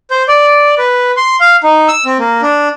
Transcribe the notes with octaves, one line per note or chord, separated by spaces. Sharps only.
C5
D5
B4
C6
F5
D#4
E6
C4
A#3
D4